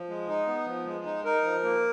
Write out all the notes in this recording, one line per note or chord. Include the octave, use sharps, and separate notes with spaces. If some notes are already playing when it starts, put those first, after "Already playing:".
Already playing: F3
G#3
D#4
B3
F3
G#3
D#4
D#4 A#4
F3
A#3